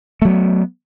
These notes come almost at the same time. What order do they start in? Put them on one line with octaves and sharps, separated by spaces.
A3 F#3 B3